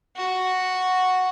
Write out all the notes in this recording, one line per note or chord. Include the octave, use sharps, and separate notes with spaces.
F#4